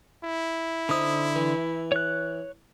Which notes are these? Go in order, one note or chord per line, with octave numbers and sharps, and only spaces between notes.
E4
D3 C4 D#4 D#6
E3
C#5 F#6